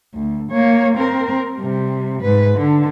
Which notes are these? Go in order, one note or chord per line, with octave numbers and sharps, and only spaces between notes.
D2
A#3 C#5
C4 A#4
C3 G3
G#2 B4
D3